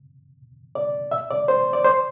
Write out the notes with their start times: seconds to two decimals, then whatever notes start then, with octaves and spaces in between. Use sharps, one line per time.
0.75 D5
1.11 E5
1.31 D5
1.48 C5
1.73 D5
1.85 C5